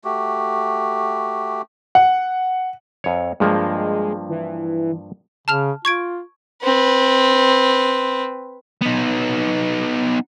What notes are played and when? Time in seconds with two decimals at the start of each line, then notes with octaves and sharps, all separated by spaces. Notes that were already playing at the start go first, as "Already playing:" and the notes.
0.04 A3 F#4 G4
1.95 F#5
3.04 F2 C#5
3.40 G2 F3 G#3 A#3
4.29 E3
5.48 C#3 A5 F6 F7
5.85 F4 C#6 G#6 D7
6.63 C4 B4
8.82 B3 D#4